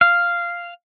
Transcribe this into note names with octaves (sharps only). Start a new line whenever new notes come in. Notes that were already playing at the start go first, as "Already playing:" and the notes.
F5